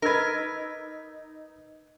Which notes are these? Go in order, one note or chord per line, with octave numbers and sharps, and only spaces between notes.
D#4 A#4 B4 E6 G#6